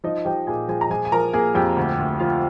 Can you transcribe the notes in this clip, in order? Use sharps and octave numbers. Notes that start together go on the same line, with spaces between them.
F3 D#4 D#5
F3 G4 G5
A#2 G#4 G#5
F3 G#4 G#5
A#5
F3 G#4 G#5
G#5
F3 A#4 A#5
A#3 G#4 G#5
F2 G4 G5
D2
D2
F3 F4 F5